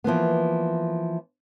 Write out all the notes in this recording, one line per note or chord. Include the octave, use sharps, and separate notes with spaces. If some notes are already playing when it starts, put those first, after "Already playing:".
E3 F3 A#3 B3